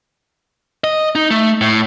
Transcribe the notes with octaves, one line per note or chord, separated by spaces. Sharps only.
D#5
D#4
A3
A2